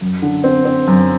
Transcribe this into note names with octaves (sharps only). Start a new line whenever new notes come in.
F#2
D3
C4
C4
F#2